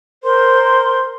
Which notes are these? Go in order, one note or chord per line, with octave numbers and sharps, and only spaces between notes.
A#4 C5 C6